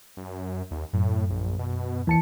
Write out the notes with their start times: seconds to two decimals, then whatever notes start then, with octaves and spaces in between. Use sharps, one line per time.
0.17 F#2
0.71 D#2
0.93 F#2 A2
1.30 A#1
1.59 B2
2.07 D#2 E3 A5 C#7